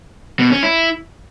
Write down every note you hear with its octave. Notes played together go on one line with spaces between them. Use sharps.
B2
C#4
E4